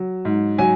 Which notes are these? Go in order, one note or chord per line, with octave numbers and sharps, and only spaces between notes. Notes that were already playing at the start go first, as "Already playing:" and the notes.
Already playing: F#3
G#2
F#3 G#5